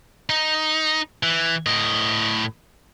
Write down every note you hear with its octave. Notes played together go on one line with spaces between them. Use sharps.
D#4
E3
A2 D#5